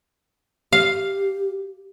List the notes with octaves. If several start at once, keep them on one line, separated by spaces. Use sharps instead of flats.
G4 F5